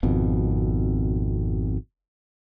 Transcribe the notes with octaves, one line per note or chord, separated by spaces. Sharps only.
G#1 F2 B2